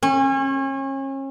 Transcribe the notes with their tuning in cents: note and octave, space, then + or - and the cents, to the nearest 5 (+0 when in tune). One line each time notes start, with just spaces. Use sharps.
C#4 -35